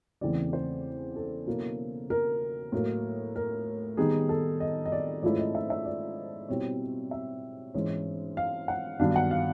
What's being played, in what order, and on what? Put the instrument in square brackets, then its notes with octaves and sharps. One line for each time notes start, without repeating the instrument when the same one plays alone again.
[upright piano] E2 C#3 E3 A3 C4 D5
C5
A4
B2 F#3 A#3 C#4 E4
A#4
A2 F#3 A#3
A#4
D#3 G3 B3 D#4 G#4
A4
D#5
D#5
D5
G#2 F3 A3 C#4 E4 D5
D#5
E5
E5
D5
B2 G3 C4 E4 C#5
E5
G#2 E3 G#3 C#4
F5
F#5
G2 D#3 F#3 B3 D4 F5
F#5
F5